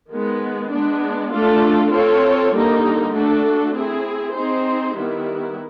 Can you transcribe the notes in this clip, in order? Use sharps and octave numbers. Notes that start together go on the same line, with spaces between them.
D#3 G#3 B3
G#3 B3 D4
A3 D4 F4 A4
C4 F4 A4 C#5
D3 G3 A#3 D#4
A3 D4 F#4 A4
C4 E4 G#4
C4 D#4 G#4 C5
D#3 G3 B3 E4